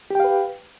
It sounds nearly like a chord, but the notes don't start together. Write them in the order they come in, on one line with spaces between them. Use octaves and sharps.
G4 G5 F5 B4